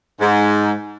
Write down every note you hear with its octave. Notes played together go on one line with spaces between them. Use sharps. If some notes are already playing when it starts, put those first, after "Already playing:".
G#2